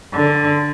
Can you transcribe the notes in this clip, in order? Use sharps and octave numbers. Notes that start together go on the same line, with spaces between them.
D3